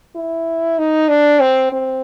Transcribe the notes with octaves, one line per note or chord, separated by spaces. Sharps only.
E4
D#4
D4
C4
C4